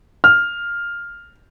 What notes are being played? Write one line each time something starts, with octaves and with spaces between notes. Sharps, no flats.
F6